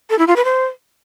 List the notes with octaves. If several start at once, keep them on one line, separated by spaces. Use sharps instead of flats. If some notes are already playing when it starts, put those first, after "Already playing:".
A4
E4
F4
B4
C5